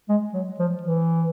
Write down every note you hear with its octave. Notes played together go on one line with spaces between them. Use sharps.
G#3
F#3
F3
E3